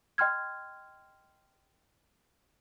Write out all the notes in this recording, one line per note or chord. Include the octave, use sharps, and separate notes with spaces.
D#5 G5 C6 F6 G#6